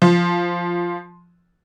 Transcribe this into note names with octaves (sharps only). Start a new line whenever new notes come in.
F3